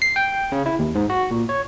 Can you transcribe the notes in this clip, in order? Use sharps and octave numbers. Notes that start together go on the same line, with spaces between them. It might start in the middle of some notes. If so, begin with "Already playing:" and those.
C7
G5
C#3
E4
D#2
G#2
F#4
A#2
C#5